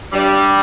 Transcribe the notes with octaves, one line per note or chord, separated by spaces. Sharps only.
G2 G3